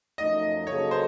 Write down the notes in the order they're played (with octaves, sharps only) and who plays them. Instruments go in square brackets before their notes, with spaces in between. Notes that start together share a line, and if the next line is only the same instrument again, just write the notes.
[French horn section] F#2 F3 A3 D#4 [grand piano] D#5
[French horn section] C#3 F#3 A#3 D#4 A4 [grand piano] C#5
[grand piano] C5